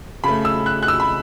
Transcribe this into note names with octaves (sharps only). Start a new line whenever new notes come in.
C#3 A3 B5
E6
F#6
F#6
E6
B5